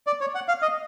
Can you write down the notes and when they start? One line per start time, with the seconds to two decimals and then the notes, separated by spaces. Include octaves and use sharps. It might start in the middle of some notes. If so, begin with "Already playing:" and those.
0.07 D5
0.21 C#5
0.35 F#5
0.48 F5
0.62 D#5